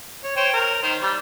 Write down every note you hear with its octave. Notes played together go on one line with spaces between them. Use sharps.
C#5
C5 C#5 G5
A#4
D#3 C5
G3